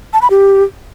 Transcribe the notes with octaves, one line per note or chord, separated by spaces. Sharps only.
A5
B5
G4